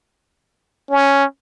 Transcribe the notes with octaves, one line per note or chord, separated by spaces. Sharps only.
C#4